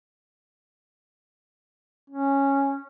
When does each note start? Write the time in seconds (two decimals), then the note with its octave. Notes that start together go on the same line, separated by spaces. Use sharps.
2.10 C#4